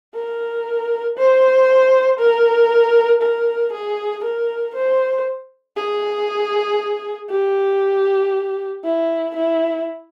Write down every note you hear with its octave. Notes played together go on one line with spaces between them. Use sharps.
A#4
C5
A#4
A#4
G#4
A#4
C5
G#4
G4
E4
E4